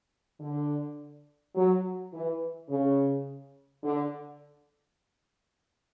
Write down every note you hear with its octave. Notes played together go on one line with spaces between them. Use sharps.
D3
F#3
E3
C#3
D3